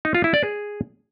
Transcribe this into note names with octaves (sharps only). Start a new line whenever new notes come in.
D#4
F4
E4
D5
G#4